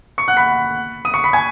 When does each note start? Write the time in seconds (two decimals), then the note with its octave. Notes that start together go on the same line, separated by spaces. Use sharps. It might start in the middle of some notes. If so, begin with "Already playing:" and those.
0.18 C#6 C#7
0.28 F#5 F#6
0.37 B5 B6
1.05 D#6 D#7
1.14 C#6 C#7
1.24 B5 B6
1.33 G#5 G#6